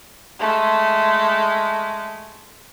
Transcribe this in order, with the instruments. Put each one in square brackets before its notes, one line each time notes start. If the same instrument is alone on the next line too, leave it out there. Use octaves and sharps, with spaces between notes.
[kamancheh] G#3 A3